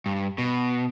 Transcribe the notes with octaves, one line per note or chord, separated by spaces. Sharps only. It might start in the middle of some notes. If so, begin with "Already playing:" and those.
G2
B2